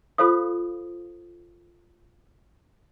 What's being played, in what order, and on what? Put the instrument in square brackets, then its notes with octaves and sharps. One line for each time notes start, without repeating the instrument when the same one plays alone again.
[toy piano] F4 A4 C5 F5 D#6